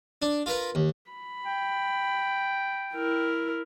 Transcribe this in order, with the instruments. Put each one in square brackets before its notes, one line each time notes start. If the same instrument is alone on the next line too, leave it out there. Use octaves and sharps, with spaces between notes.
[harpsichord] D4
F4 A#4 B4
D#2
[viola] B5
[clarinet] G5
[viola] E4 A#4